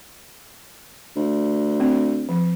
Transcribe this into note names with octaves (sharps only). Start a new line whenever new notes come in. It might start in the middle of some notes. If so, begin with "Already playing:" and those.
D2
C4
F3